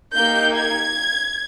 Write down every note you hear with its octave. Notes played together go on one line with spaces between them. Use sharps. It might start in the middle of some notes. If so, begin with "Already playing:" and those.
A#3 D#4 G4 G6
G#6